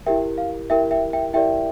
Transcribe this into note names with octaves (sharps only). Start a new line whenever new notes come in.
E4 G4 A#4 E5 G5
F5
E4 G4 A#4 E5 G5
E5 G5
E5 G5
E4 G4 A#4 D5 E5 G5